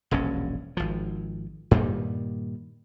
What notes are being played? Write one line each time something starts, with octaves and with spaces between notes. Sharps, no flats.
E1 A#1 G2 C#4
G#1 F3
G2 A#2 D#3 G3